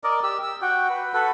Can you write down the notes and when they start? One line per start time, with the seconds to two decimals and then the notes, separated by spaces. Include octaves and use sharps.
0.04 A#4 D5 D#5
0.23 G4 E6
0.43 E6
0.61 F#4 G5
0.90 B4
1.14 F#4 A4 B4